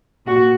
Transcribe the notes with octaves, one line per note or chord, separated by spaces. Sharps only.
A#2 F#4